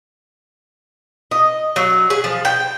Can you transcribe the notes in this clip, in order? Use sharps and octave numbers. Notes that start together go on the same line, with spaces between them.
D#5
F#3
G#4
F3
G5